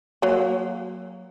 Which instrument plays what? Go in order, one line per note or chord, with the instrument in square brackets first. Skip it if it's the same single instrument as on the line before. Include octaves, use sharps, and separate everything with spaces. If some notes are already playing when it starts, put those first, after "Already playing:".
[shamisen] F#3 A#3